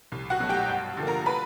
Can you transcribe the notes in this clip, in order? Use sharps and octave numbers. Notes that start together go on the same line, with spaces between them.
C2
F#4 F#5
B2 F#3 A3
G4 G5
G2
D3 F3 A#3
A#4 A#5
B4 B5